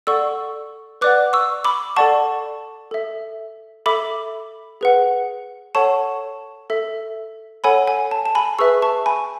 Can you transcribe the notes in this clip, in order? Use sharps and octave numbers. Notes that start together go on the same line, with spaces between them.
A4 D5 F#5 C#6 E6
B4 D5 F#5 D6 F#6
C#6 E6
B5 D6
A4 D5 F#5 A5 C#6
A4 E5
A4 E5 B5 D6
G#4 B4 F#5
A4 C#5 F#5 A5 C#6
A4 E5
A4 C#5 F#5 G#5 B5
G#5
A5
A5
G#5 B5
G#4 B4 E5 C#6 E6
A5 C#6
G#5 B5